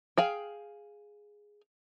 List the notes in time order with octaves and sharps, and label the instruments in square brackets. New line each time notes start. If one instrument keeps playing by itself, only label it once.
[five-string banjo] G#4 F5 G5